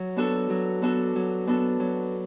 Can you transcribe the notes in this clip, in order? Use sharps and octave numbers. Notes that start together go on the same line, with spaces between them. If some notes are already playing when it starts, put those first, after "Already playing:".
Already playing: F#3
B3 D4 F#4 A4
F#3
B3 D4 F#4 A4
F#3
B3 D4 F#4 A4
F#3